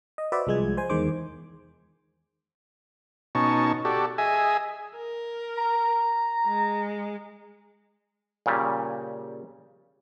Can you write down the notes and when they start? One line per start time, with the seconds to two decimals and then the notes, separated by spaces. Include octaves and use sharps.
0.18 D#5
0.32 F#4 B4 C5 D5 E5
0.47 C2 F3 G#3 G#4 G#6
0.77 C5 G#5
0.90 E2 D#3 G#3 C5 D6
3.35 B2 C#4 D#4 A5 C#6
3.85 F#4 G4 A4 D5
4.18 G#4 D#5 E5 G#5
4.96 A#4
5.58 A#5
6.46 G#3
8.46 A#2 C#3 G3